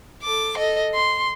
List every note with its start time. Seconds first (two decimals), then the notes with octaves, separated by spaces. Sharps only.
0.23 A4 D6
0.57 A4 D#5
0.94 C6